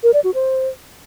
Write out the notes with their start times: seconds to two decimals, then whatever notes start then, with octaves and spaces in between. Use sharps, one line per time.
0.03 A#4
0.14 D5
0.24 F#4
0.35 C5